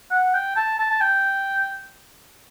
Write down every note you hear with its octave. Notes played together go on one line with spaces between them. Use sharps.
F#5
G5
A5
A5
A5
G5